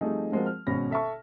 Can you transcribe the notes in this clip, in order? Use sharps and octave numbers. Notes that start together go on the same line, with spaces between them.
F3 G3 A3 C4 D#4 G#4
F3 G#3 C4 F#4 A#4
F6
G#1 B2 C#4 B5 A#6
A4 E5 A5 C#6